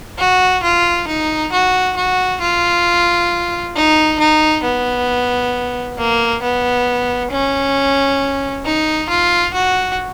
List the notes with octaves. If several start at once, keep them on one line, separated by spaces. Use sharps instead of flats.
F#4
F4
D#4
F#4
F#4
F4
D#4
D#4
B3
A#3
B3
C#4
D#4
F4
F#4